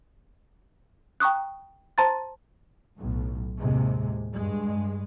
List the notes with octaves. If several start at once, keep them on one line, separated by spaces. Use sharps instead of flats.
G5 A#5 C#6 D#6 F#6
C5 A5 A#5 C6 A6
B1 A2
D#2 A2 C3 G#3
G2 G#3